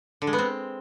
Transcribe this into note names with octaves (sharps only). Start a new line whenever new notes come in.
D3
G#3
B3
C4